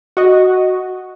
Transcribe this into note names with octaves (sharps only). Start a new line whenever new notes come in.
F#4 D#5